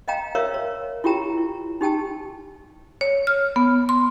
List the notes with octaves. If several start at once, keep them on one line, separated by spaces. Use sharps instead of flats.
D#5 F5 G5 A#5
A#4 C#5 D5 E5 F5
C#5
E4 F4 G4 G5 A#5
E4
D#4 G4 G5 A5
C#5
F6
B3
C6